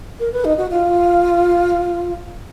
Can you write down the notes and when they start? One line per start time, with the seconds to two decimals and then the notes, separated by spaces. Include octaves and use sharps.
0.19 A#4
0.32 B4
0.44 D#4
0.57 F#4
0.70 F4